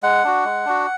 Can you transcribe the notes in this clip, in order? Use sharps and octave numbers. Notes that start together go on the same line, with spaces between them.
G#3 F#5
D4 F#4
G#3
D4 F#4